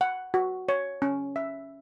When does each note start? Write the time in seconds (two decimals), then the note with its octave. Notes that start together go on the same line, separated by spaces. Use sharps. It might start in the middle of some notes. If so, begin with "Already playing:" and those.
0.01 F#5
0.34 F#4
0.69 C#5
1.02 C#4
1.36 E5